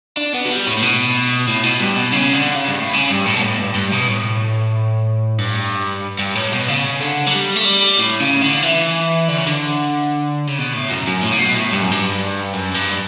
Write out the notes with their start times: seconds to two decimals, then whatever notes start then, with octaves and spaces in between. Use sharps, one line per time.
0.17 D4
0.34 B3
0.45 F#3
0.50 G3
0.67 A2
0.78 A2
0.83 B2
1.48 A2
1.64 B2
1.80 G2
1.96 B2
2.13 C#3
2.34 D3
2.56 C#3
2.68 G2
2.78 A2
2.94 C#3
3.11 G2
3.27 A2
3.36 B2
3.43 A2
3.59 G2
3.75 G2
3.92 B2
4.08 A2
5.38 G2
6.19 G2
6.35 A2
6.52 B2
6.68 C#3
7.00 D3
7.26 F#3
7.33 G3
7.55 A3
7.65 G3
7.98 A2
8.20 C#3
8.42 D3
8.62 E3
9.28 D3
9.38 C#3
9.47 D3
10.48 C#3
10.59 B2
10.74 A2
10.90 F#2
11.07 F#2
11.23 A2
11.33 C#3
11.40 B2
11.55 A2
11.72 G2
11.82 F#2
11.91 G2
12.54 F#2
12.75 G2